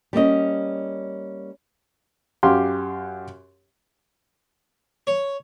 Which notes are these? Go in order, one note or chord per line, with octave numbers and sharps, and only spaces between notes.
G3 A#3 C#4 D#5
F#2 G4 F5 C6
C#5